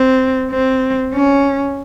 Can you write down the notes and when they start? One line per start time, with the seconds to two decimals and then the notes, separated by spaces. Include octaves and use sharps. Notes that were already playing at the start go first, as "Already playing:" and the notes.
Already playing: C4
0.51 C4
1.14 C#4